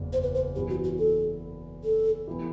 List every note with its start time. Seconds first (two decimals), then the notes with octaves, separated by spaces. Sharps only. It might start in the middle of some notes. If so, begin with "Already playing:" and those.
Already playing: F#1 E2 B2
0.13 C5
0.23 B4
0.35 C5
0.56 F#2 E3 B3 G4
0.70 F#4
0.84 F#4
0.99 A4
1.84 A4
2.27 E3 B3 E4 G4